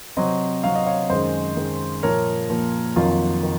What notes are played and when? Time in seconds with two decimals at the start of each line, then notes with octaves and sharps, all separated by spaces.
0.17 C3 F#3 C4 C5 D#5
0.64 C3 F#3 C4 F5
0.75 D#5
0.87 C#5 F5
1.10 F#2 D#3 G#3 C5 D#5
1.57 F#2 D#3 G#3
2.03 A#2 F3 A#3 A#4 C#5
2.50 A#2 F3 A#3
2.96 F2 D#3 F#3 A#3 F4
3.43 D#3